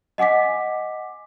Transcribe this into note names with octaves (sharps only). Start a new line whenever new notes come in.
D#5 F#5 G#5 D6 B6